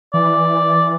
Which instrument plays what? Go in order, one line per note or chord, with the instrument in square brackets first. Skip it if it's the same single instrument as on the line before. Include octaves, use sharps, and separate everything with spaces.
[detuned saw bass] E3 [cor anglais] D5